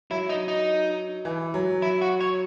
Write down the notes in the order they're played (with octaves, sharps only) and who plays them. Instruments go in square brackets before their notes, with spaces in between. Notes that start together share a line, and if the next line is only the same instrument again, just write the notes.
[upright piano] F#3 [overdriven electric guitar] E4
[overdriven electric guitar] D#4
D#4
[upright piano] E3
F#3
[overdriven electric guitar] E4
F#4
C#5